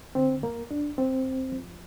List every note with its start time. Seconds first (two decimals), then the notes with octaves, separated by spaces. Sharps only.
0.15 D3 C4
0.43 F2 A#3
0.70 F2 D4
0.98 F2 C4
1.25 D2
1.52 F3